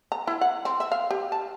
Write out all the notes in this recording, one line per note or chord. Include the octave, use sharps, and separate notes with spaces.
A#5
E4
F#5
C4
E5
F5
G4
A5